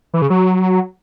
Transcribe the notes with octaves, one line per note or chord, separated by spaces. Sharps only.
E3
C#3
F#3